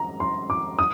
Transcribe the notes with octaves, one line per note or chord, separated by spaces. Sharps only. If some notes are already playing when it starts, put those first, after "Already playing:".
Already playing: A#5
C6
D6
D#6